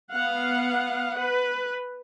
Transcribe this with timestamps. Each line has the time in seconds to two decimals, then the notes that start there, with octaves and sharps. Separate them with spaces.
0.12 B3 F5 F#5
1.19 B4